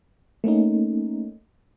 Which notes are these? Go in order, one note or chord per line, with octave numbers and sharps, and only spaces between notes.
A3 A#3 C#4 D#4